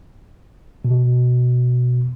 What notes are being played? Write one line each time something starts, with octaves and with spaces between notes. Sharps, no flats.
B2